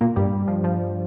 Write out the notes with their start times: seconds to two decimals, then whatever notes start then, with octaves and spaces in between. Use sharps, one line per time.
0.01 A#2 A#3
0.16 G2 G3
0.48 F3
0.64 F3